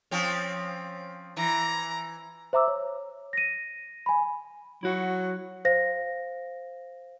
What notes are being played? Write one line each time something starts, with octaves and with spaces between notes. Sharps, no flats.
F3 C4 C#4
E3 A#5
C5 E5 A#5 D6 E6
C#5
A#6 D#7
G#5 B5
F#3 E4 F#4 F#5
C5 F5 A#6